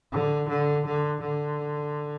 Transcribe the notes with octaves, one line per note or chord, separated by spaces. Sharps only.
D3
D3
D3
D3